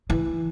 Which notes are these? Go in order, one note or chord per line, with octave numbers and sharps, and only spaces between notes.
E3